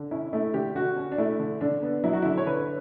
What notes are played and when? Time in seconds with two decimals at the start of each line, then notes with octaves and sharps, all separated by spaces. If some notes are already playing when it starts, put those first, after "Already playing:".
Already playing: D3
0.11 C#4 E4
0.33 A3 E4
0.54 D3 G4
0.75 D3 F#4
0.97 C#4
1.12 D4
1.18 A3 E4
1.40 D3
1.61 D3 D4
1.82 B3
2.04 F#3 E4
2.13 F#4
2.22 D3 E4
2.38 C#5
2.46 D3 B4